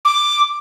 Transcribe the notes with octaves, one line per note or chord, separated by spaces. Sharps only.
D6